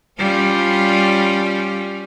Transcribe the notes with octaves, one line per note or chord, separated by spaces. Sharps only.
G3 C#4 F4